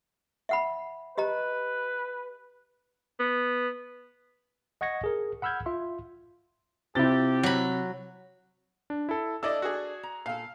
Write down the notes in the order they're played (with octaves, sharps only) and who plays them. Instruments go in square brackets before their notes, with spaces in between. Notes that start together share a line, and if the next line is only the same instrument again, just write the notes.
[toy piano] E5 F#5 B5
[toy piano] G4 D#5 A#5 [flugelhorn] B4
[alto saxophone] B3
[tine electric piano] D#5 F#5 C#6 G#6 A#6 C#7
G#4 A#4
F#5 B5 E6 F6 G6 G#6
F4 E5 C6
[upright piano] C3 A6 [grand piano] C4 E4 [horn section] F4 G4
[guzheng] F#3 B5
[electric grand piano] D4
E4 A4
[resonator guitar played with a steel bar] D4 A4 [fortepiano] E4 D5 D#5 [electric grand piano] E6
[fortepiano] F#4 G#4
[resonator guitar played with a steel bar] A#5
[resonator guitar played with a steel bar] A#2 A4 [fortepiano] F5